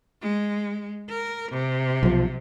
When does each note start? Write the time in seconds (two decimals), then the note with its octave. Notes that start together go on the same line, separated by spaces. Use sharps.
0.22 G#3
1.09 A#4
1.52 C3
2.03 B1 F3